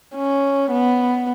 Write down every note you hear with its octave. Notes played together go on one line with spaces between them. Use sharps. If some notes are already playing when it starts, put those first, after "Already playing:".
C#4
B3